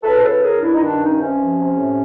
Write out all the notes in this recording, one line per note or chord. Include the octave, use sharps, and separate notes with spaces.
C#2 A4 B4
C5
C#3 A4 B4
C#2 G#4 A#4
G2 D4 E4
D#4
D#3 D4
G2 C#4 D#4
C3 C#4
F3
C3
A2